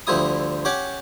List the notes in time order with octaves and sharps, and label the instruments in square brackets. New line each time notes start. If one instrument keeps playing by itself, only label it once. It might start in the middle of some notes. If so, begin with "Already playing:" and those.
[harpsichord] D2 F3 G3 E4 D#6
C#4 G4 F#5 D6